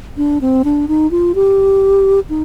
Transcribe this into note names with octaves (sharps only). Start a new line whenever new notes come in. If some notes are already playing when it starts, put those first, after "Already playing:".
D4
C4
D4
D#4
F4
G4
D#4